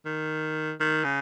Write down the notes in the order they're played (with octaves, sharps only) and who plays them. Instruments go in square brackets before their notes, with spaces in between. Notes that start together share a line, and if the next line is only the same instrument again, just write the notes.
[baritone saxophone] D#3
D#3
C#3